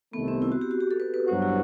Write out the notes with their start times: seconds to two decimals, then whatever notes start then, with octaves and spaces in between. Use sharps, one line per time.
0.13 C2 C3 D#3 A3 B3
0.28 C4
0.42 E4
0.52 F#4
0.61 G4
0.71 F#4
0.80 G4
0.91 A4
1.00 B4
1.14 B4
1.28 G2 F#3 B3 F#4 C5
1.42 E4